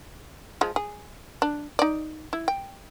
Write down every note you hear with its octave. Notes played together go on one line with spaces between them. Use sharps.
F3 G#3
G#4
D4
D#4 D5
E4
G5